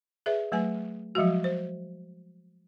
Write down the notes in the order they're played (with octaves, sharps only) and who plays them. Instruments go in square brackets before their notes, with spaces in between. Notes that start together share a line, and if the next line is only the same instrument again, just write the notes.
[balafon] G#4 B4 D5 E5
F#3 A3 B4 G#5
F3 F#3 G#3 F#4
C5